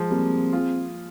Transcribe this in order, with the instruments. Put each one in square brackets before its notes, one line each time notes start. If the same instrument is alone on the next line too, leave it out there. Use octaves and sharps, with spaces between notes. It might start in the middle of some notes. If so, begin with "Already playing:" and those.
Already playing: [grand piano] F3 G#3
[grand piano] G3 A#3 [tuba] C4
[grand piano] F4 G#4